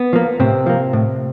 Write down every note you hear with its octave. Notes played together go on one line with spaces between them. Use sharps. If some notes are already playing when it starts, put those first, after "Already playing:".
Already playing: B3
F3 A#3
A2 C3 C4
F3 A#3
A2